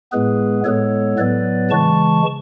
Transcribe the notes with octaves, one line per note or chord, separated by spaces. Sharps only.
A2 G#3 B3 G#4 B4
A2 G#3 B3 A4 C#5
A2 F#3 B3 B4 D5
C#3 E3 G#3 A5 C#6